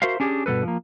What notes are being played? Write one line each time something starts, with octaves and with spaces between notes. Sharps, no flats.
F#4 A#4 C5 E5 F5
C#4 D4 G4 G#4
G2 B2 G3 A4 B4
F3 A#3